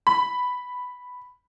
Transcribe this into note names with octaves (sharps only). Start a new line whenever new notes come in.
B5